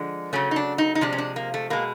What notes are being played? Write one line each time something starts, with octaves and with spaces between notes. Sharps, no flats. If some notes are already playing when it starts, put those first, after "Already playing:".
Already playing: D3 F3 G#3
C#3 F#3 A3 C#4
D#4
D4
D#4
D#4
C3 F3 G#3 D4
C#4
D4
A#3
A3
B2 G#3 A#3